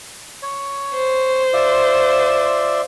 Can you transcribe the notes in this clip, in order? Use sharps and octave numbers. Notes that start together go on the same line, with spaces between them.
C#5
C5
F4 D5 E5